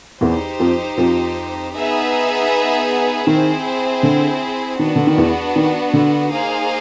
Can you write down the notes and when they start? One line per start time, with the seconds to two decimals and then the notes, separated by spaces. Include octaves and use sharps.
0.21 E2 E3 D#4 G4 C5
0.60 F2 F3
0.98 F2 F3
1.74 B3 D#4 G#4 B4 E5
3.27 D#3 C4 E4 G#4 C5
4.03 D3
4.79 D#3 B3 D4 F#4
4.96 D3
5.07 D#3
5.18 E2 E3
5.56 D#3
5.94 D3
6.32 A#3 D#4 G#4 C5 F5